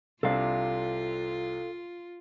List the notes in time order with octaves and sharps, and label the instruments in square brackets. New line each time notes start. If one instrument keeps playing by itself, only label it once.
[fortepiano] C2 C3 D4 [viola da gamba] F4 [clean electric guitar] A4 F5